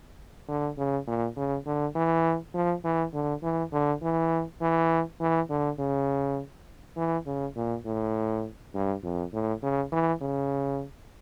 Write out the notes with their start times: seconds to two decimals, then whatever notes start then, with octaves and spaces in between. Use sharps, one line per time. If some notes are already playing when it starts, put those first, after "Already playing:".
0.49 D3
0.78 C#3
1.07 A#2
1.37 C#3
1.66 D3
1.95 E3
2.54 F3
2.84 E3
3.14 D3
3.43 E3
3.72 D3
4.02 E3
4.61 E3
5.20 E3
5.50 D3
5.79 C#3
6.97 E3
7.26 C#3
7.56 A#2
7.85 A2
8.74 G2
9.04 F2
9.33 A2
9.63 C#3
9.92 E3
10.22 C#3